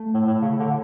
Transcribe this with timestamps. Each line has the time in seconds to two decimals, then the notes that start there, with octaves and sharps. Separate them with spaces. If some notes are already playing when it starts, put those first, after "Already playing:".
Already playing: A3
0.14 A2
0.27 A2
0.41 C#3
0.59 D3